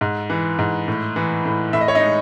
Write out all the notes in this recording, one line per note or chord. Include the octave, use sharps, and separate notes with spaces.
G#2
E3
G#2
A2
E3
A2
A2 E5
D#5
C#5
D#4 D#5
G#3